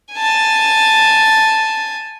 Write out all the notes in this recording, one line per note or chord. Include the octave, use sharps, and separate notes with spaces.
G#5 A5